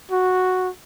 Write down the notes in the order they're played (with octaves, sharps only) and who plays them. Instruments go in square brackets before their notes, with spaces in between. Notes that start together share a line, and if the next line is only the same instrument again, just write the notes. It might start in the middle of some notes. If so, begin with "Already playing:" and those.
[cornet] F#4